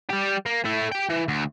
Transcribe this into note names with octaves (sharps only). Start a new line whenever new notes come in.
G3 G4
A#3
A3 E4
G4 G5
E3
D2